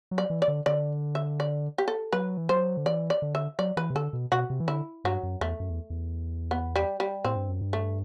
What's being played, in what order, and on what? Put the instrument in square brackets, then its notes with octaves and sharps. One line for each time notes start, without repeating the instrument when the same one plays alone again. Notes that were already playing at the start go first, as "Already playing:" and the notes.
[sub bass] F#3
[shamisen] D5
[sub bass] E3
[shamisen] D5
[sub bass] D3
[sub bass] D3 [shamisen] D5
[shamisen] E5
D5
G4
A4
[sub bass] F#3 [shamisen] B4
[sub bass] E3
[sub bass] F#3 [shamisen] C5
[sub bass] D3
[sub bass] E3 [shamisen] D5
[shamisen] D5
[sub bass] D3
[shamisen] E5
[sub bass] F#3 [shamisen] D5
[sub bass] E3 [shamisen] B4
[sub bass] C3
[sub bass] D3 [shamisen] A4
[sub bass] B2
[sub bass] B2 [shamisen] F#4
[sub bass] C3
E3
[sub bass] D3 [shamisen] E4
[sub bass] G2 [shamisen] F#3
[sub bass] F#2
[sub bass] E2 [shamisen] A3
[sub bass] F#2
E2
E2
[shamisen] B3
G3
G3
[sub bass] A2 [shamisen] C4
[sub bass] G2
F#2
G2
[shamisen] A3